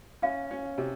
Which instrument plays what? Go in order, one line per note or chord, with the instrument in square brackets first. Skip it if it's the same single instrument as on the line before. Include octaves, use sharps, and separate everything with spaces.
[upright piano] C#4 [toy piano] F5
[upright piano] C#4
C3